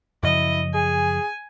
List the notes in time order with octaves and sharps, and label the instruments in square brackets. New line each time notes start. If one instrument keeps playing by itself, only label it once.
[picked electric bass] F#2 C#3 F3 [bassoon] E4 [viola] D#5
[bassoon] G#4 [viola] G#5